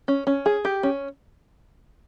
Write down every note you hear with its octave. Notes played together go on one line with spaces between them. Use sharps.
C#4
C#4
G#4
G4
C#4